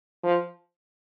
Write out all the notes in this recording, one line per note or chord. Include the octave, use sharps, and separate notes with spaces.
F3